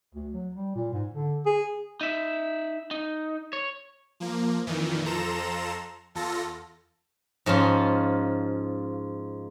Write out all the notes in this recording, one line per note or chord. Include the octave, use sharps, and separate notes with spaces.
D2
F#3
G3
A#2
G#2
D3
G#4
D#4 E5
D#4
C#5
F3 A#3
F2 A#2 D#3 E3
F2 F3 A4 A#5 C6 E7
E2 F4 A4 A#6
G#2 F3 C#4 F4